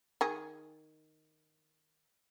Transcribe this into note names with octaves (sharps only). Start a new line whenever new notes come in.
D#3 G#4